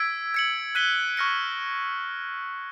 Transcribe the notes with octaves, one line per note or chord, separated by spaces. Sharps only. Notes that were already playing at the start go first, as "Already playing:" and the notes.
Already playing: E6 G#6 B6 D7
G#6 C#7 F#7
F#6 B6 D#7 G7
C#6 F6 A#6 C#7